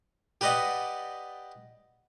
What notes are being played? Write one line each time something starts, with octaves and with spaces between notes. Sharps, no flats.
G4 B4 D5 D#5 F#5